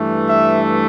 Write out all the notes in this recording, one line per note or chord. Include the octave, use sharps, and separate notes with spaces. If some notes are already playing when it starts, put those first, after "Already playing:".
Already playing: G2 E3 A3
E5